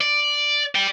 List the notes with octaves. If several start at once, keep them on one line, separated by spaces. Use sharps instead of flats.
D5
D5 G5